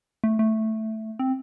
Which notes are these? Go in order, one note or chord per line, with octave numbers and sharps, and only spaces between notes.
A3
A3
C4